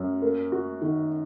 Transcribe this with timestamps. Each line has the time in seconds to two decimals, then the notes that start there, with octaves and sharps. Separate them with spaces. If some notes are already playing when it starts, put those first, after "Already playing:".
Already playing: F#2
0.22 A#3
0.52 F#4
0.82 D#3